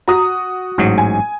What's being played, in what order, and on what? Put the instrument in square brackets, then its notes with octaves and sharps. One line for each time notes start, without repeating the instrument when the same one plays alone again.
[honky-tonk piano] F#4 D#6 [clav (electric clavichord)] A#5
[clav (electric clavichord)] A1 G#2 F#3
[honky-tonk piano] G#5